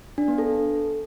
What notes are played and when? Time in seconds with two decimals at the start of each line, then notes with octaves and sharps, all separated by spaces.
0.18 D4
0.28 B3
0.38 A4